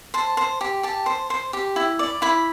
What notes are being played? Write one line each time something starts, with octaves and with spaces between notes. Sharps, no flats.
C5 A5
C5
G4
G4 A5
C5
C5
G4
E4
D5
E4 B5